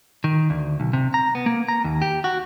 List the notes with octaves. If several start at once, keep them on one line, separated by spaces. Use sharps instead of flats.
D#3
D2
B1
C3
A#5
B3
A#3
A#5
D#2
G4
F#4